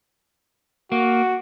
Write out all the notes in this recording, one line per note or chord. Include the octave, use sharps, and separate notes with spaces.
A#3 F#4